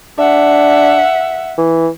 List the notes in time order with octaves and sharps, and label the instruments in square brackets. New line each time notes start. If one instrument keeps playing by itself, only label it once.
[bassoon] D4 [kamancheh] E5 F#5
[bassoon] E3